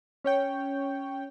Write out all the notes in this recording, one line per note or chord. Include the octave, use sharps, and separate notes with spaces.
C#4 C#5 G5